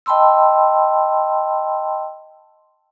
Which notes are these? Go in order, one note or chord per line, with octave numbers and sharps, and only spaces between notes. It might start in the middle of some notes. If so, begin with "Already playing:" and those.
D#5 G5 A5 B5 C6 E6